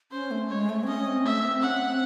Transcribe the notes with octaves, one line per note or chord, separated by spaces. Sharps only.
C#4 C5
A3
G#3 C#5
A3
C4
C#4 D#5
C4
A3 E5
C4
C#4 F#5
C4